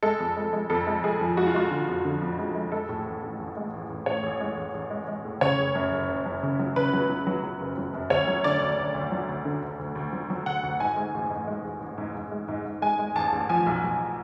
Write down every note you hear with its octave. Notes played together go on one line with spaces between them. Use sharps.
G#3 A4
F2
G#3
G#3
F2 A4
G#3
G#3 G#4
F3
G#3 F#4
F4
G#3 F#4
D3
F2
D3
F2
G#3
G#3
G#3 A4
A2
A1
A2
A1
G#3
A1
A1
A2 C#5
A1
G#3
A1
A1
G#3
G#3
A2
C#3 C#5
F#1
F#2
F#1
F#1
F#2
C#3
F#3
C#3 B4
F#3
F#3
F#3
F#3
F#1
F#3
F#2
D2 C#5
F#3
D3 D5
D2
D2
D2
F#3
D2
D3
D2
D2
D2
F#3
F#3
D2 F#5
D2
G#2 G#5
G#3
A1
G#2
G#3
A1
A1
G#2
G#2
G#3
G#2
G#2
G#3 G#5
G#3
A1 A5
A1
F3 G#5
B1
B1